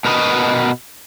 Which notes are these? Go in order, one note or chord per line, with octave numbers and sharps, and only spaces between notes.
B2 A#4 B4 D#5